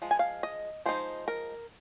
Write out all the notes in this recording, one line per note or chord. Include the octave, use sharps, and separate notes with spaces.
F3 G#3
G#5
F5
D#5
F3 G#3 D#4 C5
A#4